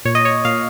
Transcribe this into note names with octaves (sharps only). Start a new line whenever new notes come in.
A#2 C#5
D#5
C#5
A#2 F5